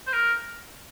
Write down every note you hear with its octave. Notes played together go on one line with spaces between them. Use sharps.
C5
A#4